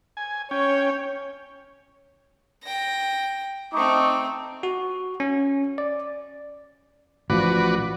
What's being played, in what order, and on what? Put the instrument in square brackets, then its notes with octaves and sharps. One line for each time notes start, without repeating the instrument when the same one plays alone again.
[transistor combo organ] G#5
[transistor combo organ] C#4 G5 [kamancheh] C#5
[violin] G5 A#6
[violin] A3 C4 [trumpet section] D#4 C#6 D6
[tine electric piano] F#4
C#4
D5
[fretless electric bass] A1 F3 [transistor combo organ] F#4 B4 D5